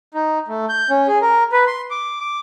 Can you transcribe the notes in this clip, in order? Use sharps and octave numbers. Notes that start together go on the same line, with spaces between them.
D#4
A3
G6
C#4
G#4
A#4
B4
C6
D6
D6